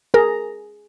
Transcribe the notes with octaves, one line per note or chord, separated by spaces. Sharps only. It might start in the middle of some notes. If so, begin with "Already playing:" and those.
G#4 A#4